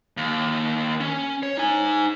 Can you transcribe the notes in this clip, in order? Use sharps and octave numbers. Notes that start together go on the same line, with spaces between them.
D#2
C#4
C#5
D#4 G#5